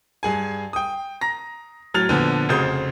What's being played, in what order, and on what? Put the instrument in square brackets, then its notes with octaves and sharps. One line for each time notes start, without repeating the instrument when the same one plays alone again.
[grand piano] G2 G#4 G#5
G5 D#6
A#5 A#6
A2 F#3 F6 A6 F7
A#2 D3 F3 B3
F1 C#3 F#4 C5 D#6 G6